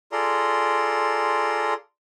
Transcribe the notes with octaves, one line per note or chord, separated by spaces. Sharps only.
F4 G#4 A4 D5 A#5 C6